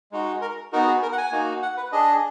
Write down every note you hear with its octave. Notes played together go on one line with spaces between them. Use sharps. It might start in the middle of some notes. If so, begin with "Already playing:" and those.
G#3 D#4 F#4
A#4
B3 D#4 F#4 A#4
G#4
A#4
F#5
G#5
A#3 D#4 F#4
F#5
B4
D4 G#4 D#5